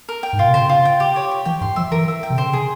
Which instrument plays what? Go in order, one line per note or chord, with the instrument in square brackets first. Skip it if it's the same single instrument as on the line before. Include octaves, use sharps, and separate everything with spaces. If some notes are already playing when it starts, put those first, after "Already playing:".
[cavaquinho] A#4
G5
[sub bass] G#2
[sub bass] A#2 [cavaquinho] F4
[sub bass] C3
[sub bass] C#3 [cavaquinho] C5
[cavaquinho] F4
G5
G4
C#5
G4
[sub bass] E3 [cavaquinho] G5
[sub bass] G2 [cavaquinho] C6
[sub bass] F3 [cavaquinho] E5
[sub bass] E3 [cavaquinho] A#4
[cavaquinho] E5
G5
[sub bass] C3
[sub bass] C#3 [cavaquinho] C5
[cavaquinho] G#4